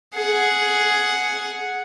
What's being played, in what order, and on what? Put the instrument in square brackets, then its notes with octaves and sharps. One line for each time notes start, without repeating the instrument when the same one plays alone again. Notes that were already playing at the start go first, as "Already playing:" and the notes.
[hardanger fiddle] G#4 F#5